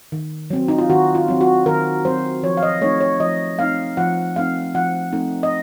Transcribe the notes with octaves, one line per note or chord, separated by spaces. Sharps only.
D#3
F#3 C4
D#4
F4
D#3 F#4
F4
F#3 C4
F#4
D#3 A#4
F#3 C4 C5
F3 C#5
F5
D#5
A3 C4 D#4 C#5
C#5
F3 D#5
A3 C4 D#4 F5
F3 F#5
A3 C4 D#4 F5
F3 F#5
A3 C4 D#4
D#5